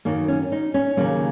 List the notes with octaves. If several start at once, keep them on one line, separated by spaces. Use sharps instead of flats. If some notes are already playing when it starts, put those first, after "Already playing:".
F#2 D#3 F#3 A#3
C#4
D#4
C#4
D#2 C#3 F#3 A#3